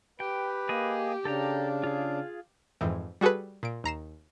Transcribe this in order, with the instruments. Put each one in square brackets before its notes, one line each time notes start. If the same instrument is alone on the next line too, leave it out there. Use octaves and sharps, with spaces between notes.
[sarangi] G4 [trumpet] B4 [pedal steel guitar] G5
[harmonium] A#3 [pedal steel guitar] G#4 D#5
[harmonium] C#3 D4 [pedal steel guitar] A4 G5 A#5 [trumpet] F5
[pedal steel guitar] F4 G#4
[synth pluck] F2 G#2 E3
G3 F#4 G#4 A4 B4
A#2 D7
D#2 A#5 C7 E7